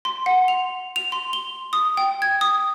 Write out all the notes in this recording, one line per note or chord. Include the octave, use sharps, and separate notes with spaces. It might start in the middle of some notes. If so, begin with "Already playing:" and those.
C6
F#5
F7
F7
C6
G7
D#6
G5
G#6
D#6